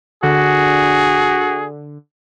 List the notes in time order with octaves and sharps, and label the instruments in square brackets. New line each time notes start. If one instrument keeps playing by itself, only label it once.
[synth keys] D3 [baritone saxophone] F#4 [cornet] G#4